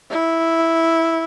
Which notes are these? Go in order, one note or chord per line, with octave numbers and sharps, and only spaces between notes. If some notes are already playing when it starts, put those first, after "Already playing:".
E4